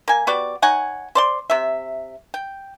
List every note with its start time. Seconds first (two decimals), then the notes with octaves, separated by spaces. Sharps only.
0.08 A#3 G#5
0.27 B3 F#4 G4 D5
0.62 D#4 C#5 F#5 G#5
1.15 C5 D5 C6
1.50 C3 E5
2.34 G5